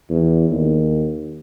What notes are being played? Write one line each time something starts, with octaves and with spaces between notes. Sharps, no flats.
E2
D#2